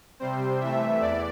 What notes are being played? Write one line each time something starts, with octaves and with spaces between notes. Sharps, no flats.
C3 G3 C4 C5
C3 E3 A3 E5
E2 E3 D5